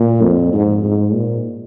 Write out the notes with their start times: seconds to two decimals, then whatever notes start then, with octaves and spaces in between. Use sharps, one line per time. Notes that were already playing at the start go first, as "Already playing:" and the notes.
Already playing: A#2
0.23 F2
0.54 G#2
0.84 G#2
1.13 A#2